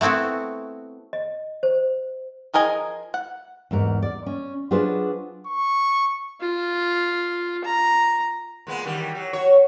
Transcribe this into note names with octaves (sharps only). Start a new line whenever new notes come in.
A3 B3 C4 E4 F#4
D#5
C5
F3 G#4 A#4 D#5 G#5
F#5
E2 G#2 A#4 F#5
D5
C#4
F#3 D4 F4 G#4 B4 C5
C#6
F4
A#5
A#2 G#3 B3
D#3 E3 G3
F#3
F#4 C#5